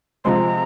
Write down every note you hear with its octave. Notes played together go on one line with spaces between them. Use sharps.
C3 F3 G#3 C4 A#5 C6